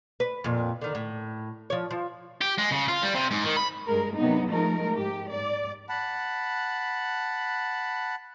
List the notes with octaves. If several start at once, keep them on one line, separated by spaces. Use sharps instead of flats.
B4
F2 A#2
D3 D#3
A2
F3 C#5
F3
G4
G#3
C#3
F4
G3
C3
G#2
D#3
B5
G2 G#3 A#4
C3 F#3 B3 D#4
F3 G#3 A3 D#4 A#4
G#2 G4
G#2 D5
F#5 A5 B5